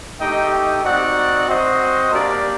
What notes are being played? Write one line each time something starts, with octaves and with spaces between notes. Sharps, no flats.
A3 D#4 G4 D#5 G5
D#5 G5
C4 D#4 F#4 D5 F#5
C4 F#4 C5 D#5
A#3 D4 G4 A#4 D5